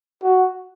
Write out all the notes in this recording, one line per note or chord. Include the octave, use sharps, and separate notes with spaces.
F#4